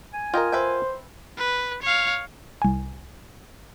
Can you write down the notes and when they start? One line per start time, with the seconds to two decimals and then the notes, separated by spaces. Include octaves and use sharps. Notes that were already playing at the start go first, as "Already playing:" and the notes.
0.13 G#5
0.34 F4 A#4 D#5 G5
0.52 B4 C5 E5 G5
1.38 B4
1.83 C#5 F5
2.62 C2 G#5